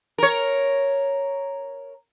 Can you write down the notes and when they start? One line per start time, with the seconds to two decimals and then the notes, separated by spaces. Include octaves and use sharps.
0.18 A#4 C#5